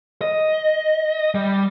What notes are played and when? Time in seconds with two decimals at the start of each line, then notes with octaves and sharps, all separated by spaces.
0.21 D#5
1.35 G3